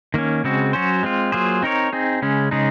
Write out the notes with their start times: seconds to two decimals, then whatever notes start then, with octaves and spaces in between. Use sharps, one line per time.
0.14 D#3 A#3 C#4
0.44 C#3 G#3 C4 F#4
0.73 F#3 C#4 F#4 C5
1.03 G#3 C4 F4
1.32 F#3 A#3 F4 G#4 C5
1.63 C4 D#4 A#4 C#5
1.93 C4 D#4 G#4
2.22 C#3 G#3 C#4
2.51 C#3 G#3 D#4 G#4